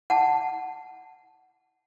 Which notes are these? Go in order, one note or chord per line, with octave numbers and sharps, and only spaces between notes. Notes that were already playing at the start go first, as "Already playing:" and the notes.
F#5 A5